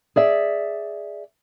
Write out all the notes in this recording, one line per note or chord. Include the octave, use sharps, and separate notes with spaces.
G#4 D5 E5